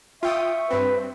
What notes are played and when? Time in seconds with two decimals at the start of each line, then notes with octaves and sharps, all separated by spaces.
0.23 F4 E5 G5 C#6 D#6
0.71 G2 C4 B4